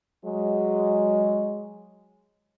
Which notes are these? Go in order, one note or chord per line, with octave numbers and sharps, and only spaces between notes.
F#3 G#3